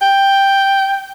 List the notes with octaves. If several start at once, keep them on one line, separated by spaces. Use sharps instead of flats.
G5